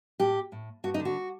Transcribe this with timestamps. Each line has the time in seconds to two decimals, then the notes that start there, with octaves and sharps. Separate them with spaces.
0.20 A2 G4
0.52 A2
0.84 G2 F#4
0.94 D#4
1.00 D3
1.05 F#4